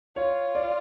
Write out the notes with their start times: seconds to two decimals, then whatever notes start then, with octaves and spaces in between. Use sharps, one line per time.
0.16 F4 C#5
0.55 D5